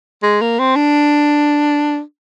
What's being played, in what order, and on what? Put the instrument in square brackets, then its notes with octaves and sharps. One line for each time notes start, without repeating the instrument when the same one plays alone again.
[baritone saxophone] G#3
A#3
C4
D4